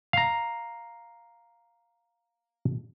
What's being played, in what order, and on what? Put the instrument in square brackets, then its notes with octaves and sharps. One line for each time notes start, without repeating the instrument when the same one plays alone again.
[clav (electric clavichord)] F5 A#5